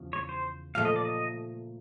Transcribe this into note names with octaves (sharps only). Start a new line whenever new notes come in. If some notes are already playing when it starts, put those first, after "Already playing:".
Already playing: E2 C#3 F3
C#5
C5
A#2 F3 A3 F5
D#5
D5
D#5